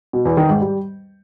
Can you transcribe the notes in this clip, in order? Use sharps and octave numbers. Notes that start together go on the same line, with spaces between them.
B2
E2
D#3
G#2
G3